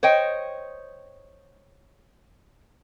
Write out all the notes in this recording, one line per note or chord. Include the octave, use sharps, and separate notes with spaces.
C5 C#5 D#5 G5